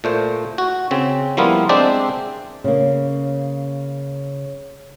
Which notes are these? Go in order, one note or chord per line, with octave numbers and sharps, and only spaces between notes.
A#2 A3 C5
F#4
C#3 C4
F3 G3 A#3 B3 E4 F4
G#3 C4 D4 C5 D5 E5
C#3 A#3